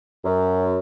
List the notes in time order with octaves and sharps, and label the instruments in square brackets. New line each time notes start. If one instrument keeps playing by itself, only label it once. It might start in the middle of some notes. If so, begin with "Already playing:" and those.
[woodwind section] F#2